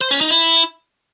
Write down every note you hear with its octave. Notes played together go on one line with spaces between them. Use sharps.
C5
C#4
D#4
E4